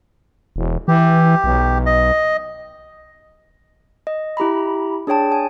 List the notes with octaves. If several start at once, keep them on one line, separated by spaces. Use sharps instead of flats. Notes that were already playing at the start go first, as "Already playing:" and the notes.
E1
E3 G4
B1
D#5
D#5
E4 G4 A#5 B5
D4 G#4 C#5 G5 A5
G#5